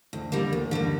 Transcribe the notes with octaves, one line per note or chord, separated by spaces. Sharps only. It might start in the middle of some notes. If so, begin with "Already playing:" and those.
D2
D3 G3 A#3
D2
D3 G3 A#3